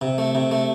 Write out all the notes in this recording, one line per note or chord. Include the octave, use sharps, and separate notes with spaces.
C3
A3
C3
A3